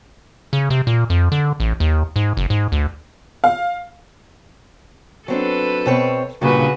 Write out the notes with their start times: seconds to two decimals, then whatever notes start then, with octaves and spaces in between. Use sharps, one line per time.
0.53 C#3
0.70 C3
0.87 A#2
1.10 F2
1.32 D3
1.60 A1
1.80 D#2
2.16 G#2
2.37 F#1
2.50 G#2
2.72 D2
3.44 F5
5.28 F#3 C4 D4 A4 B4
5.86 B2 C4 C#5
6.42 G2 A#2 C#3 F#4 B4